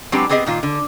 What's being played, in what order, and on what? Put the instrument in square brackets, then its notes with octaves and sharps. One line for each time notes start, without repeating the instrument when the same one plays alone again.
[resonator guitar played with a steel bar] F#3 G#3 C4 D4 G4 B4
B3 C4 G4 G#4 D#5
A#2 D#3 F4
D3